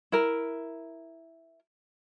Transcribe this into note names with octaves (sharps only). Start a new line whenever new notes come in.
E4 A#4